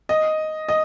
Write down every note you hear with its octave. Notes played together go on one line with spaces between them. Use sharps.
D#5
D#5